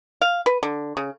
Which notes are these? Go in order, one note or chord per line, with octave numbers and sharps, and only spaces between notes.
F5
B4
D3
C#3